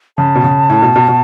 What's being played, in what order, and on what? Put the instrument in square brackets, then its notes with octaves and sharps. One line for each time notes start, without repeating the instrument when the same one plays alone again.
[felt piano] C#3 [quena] A5
[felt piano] B2
C#3
A2
B2
B2
B2